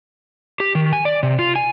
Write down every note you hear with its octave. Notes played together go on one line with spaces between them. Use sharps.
G4
D#3
G#5
D5
C3
F4
G#5